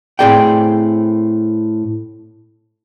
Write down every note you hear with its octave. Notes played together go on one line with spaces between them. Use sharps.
A2 C4 G#4 D5 G5